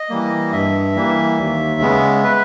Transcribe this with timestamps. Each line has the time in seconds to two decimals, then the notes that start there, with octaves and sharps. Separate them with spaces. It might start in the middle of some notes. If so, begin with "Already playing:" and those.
Already playing: D#5
0.10 E3 G3 A#3
0.52 G2 E5
0.96 E3 G3 A#3
1.38 D#2
1.80 C#3 G#3 B3
2.24 B4